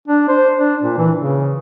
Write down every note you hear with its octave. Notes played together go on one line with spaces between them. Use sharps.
D4
C5
D4
A#2
E3
C#3